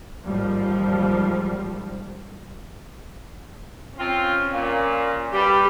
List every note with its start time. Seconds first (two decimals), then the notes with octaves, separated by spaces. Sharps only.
0.25 A1 D#2 G#2 F3 G3
3.99 C4 C#4 F4
4.52 A#2
5.33 G3 G4 B4